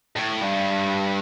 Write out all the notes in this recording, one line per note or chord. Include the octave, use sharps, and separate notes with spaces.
A2
G2